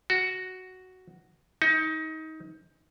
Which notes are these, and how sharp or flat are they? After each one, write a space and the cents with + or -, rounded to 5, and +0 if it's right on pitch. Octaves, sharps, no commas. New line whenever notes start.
F#4 +5
D#4 +25